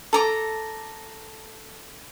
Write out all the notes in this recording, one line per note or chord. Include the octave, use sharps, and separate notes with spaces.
A4 A#5 D6